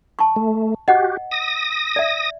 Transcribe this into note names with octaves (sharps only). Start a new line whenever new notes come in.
A5 C#6
A3
F#4 G4 D#5 F#5
D#6 A#6
D5 E5